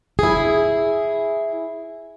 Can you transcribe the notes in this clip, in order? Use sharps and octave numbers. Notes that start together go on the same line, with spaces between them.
E4 G#4